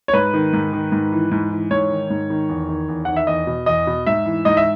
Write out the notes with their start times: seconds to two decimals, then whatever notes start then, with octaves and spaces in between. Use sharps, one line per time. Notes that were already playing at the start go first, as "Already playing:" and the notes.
0.08 C#5
0.13 G#2 B4
0.34 D#3
0.53 G#2
0.73 D#3
0.92 G#2
1.12 E3
1.31 G#2
1.51 E3
1.71 G#2 C#5
1.90 D#3
2.10 G#2
2.30 D#3
2.49 E2
2.69 D#3
2.88 E2
3.05 D#3 F#5
3.16 E5
3.27 E2 D#5
3.47 B2
3.66 E2 D#5
3.87 B2
4.07 G#2 E5
4.26 E3
4.45 G#2 D#5
4.57 E5